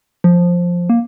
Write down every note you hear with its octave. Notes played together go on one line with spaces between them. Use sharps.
F3
A#3